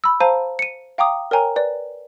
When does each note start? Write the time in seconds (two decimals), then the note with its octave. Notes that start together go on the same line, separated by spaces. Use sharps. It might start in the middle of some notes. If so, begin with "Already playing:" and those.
0.04 B5 E6
0.20 C5 F5 A5 A#5 D#7
0.59 C#7 D#7
0.98 F5 G5 A#5 D6 D#6
1.31 A#4 C#5 G5 G#5 A#5
1.56 B4 D5